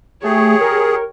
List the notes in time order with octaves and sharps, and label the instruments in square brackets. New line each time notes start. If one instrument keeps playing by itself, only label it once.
[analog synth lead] A3 [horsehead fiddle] G4 C#5 [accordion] G#4
[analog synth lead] A#4